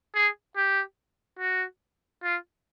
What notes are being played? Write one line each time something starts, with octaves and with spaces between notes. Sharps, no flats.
G#4
G4
F#4
F4